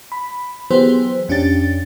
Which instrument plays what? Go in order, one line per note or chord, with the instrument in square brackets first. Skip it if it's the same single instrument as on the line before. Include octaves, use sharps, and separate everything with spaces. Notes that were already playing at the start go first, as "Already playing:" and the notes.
[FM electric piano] B5
E3 F#3 B3 G4 G#4 C5
F2 C#4 D4 G4 A6